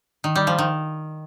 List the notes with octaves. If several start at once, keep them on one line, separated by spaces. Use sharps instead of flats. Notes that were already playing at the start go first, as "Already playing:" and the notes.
D#3
G3
F3
D#3